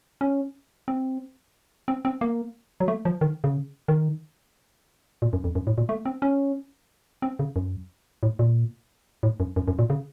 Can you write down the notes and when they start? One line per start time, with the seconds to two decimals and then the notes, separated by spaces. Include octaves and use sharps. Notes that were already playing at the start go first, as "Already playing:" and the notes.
0.21 C#4
0.88 C4
1.88 C4
2.05 C4
2.21 A#3
2.80 F#3
2.88 A3
3.05 F3
3.21 D#3
3.44 C#3
3.88 D#3
5.22 A#2
5.33 F#2
5.44 F2
5.55 F#2
5.67 A2
5.78 A#2
5.89 A3
6.05 C4
6.22 C#4
7.22 C4
7.39 C#3
7.56 F#2
8.23 A2
8.39 A#2
9.23 A2
9.40 F#2
9.56 F#2
9.68 F#2
9.79 A#2
9.90 C#3